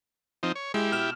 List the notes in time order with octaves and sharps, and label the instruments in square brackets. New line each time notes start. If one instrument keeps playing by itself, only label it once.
[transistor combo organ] F3 C4 D#4
C#5
[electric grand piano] G#3 [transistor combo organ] E4 G4
[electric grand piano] B2 F6 E7